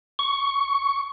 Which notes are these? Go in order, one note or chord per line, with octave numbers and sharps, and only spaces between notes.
C#6